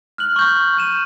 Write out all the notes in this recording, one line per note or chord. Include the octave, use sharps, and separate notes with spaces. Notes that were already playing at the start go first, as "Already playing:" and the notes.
F6 F#6 F#7
C#6 G6
G6 D#7 E7